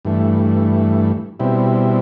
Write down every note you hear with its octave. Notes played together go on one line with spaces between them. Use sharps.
G2 E3 A3
B2 G3 C4 E4